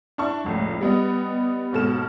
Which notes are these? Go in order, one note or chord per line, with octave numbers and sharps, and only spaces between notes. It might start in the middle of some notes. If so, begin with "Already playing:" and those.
D4 E4 A5 C#6
F1 C#2 A2
G3 B3 D#5
D#2 G#2 B2 A4 F6 E7